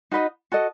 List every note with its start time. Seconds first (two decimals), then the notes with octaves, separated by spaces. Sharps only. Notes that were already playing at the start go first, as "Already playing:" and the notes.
0.11 D#4 F#4 B4 D#5
0.52 F#4 A4 D#5